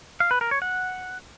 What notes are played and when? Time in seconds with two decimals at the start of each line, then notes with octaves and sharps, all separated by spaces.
0.20 F5
0.31 B4
0.41 A#4
0.51 C#5
0.62 F#5